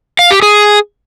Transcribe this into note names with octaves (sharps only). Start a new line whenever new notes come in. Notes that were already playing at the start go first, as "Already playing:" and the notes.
F5
G4
G#4